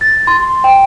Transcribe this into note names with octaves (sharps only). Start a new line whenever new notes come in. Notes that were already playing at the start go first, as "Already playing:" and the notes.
A6
C6
G5